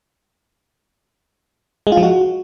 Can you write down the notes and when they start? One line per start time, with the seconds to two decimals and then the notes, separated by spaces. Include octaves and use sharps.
1.87 G#3
1.92 F4
1.97 F3
2.03 F#4